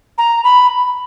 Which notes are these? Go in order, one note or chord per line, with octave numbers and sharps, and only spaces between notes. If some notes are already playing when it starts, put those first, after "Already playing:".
A#5
B5